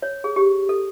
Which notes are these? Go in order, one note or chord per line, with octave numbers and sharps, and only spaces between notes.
C#5
G#4
G4
A4